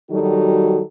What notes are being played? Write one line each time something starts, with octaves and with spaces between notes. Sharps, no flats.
D#3 F#3 G3 D#4 F#4 A4